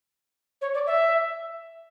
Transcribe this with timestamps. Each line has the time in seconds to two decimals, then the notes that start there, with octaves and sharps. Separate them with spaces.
0.61 C#5
0.74 D5
0.86 E5